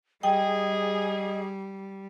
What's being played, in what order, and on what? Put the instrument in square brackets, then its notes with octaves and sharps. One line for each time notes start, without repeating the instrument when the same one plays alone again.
[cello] G3 [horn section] G#4 [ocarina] D#5 [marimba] G5